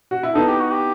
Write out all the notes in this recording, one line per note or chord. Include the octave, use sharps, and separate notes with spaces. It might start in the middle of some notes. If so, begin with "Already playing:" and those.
F#4
E4
B3 D#4 A4
G4
F#4
G4